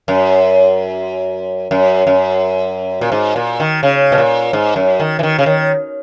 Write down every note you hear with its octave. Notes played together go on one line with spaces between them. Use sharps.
F#2
F#2
F#2
A#2
G#2
A#2
D#3
C#3
B2
A#2
G#2
F#2
D#3
E3
D#3
C#3
D#3